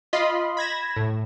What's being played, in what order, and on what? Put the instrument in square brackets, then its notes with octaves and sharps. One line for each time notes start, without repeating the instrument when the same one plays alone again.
[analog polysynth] F4 D#5 B5 C6
B5 G#6 A#6 E7
A2